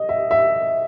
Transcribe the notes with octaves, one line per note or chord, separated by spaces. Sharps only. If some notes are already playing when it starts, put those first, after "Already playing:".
Already playing: D#5
E5
E5